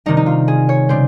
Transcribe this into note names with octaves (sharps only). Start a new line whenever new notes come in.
C3 D#3 G3 D#4
D#4
F4
G#4
C#5
C#3 G3 C5